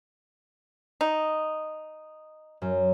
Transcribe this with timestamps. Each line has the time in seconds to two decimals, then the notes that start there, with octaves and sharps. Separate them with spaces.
1.01 D#4
2.62 F#2